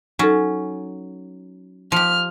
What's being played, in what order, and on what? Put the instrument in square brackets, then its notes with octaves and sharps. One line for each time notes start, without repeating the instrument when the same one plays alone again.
[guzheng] F#3 C#4 [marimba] D#4 A4
[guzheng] F3 G4 [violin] F6